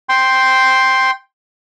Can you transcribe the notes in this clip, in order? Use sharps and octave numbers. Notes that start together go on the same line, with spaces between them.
G5 C6